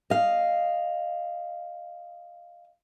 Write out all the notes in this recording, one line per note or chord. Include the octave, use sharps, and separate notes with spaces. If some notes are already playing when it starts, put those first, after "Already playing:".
D#5 F5